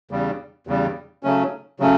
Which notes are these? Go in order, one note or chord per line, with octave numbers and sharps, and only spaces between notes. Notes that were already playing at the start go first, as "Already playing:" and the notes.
E2 C#3 G3
E2 C#3 G3
C#3 F#3 A3 C#4
C#3 F#3 A3 C#4